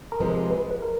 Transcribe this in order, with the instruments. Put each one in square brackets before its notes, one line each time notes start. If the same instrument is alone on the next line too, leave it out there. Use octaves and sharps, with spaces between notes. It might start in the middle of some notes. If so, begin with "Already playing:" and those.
[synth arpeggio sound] A#4
[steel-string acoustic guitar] C3 F3 G#3 [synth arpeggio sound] B4
[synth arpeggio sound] B4
B4
A#4